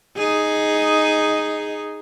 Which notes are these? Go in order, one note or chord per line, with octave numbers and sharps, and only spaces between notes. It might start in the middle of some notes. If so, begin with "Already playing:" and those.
D#4 G#4